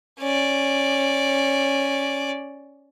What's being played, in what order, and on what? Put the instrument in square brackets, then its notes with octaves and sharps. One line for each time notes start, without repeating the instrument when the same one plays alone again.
[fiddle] C#4 D5